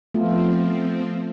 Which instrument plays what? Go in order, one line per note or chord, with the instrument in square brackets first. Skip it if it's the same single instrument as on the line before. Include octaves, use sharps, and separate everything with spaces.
[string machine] F3 C4 [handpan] A3 B3 F4